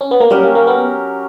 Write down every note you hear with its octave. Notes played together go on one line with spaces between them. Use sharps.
C#4
B3
A#3
F#3 G3 C#4 G4 A#4
A#3
A#3
B3